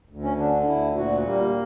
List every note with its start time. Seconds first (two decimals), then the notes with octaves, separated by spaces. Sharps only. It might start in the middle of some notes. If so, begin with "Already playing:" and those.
0.09 D2
0.23 C#4
0.37 D3 D4
0.63 D4
0.66 D2 E4
0.95 A#2 F#4
1.25 G3 A#3